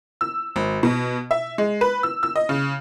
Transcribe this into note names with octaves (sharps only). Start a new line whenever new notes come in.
E6
G#1
B2
E5
G#3
B4
E6
E6
D#5
C#3